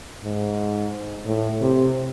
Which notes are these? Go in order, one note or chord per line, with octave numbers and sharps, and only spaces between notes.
G#2
A2
C3